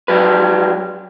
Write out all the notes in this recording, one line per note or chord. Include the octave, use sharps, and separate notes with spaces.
F#3 G3 B4